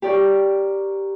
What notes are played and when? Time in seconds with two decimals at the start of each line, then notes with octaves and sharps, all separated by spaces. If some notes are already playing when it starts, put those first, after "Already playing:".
0.02 G4 A#4 D5 C#6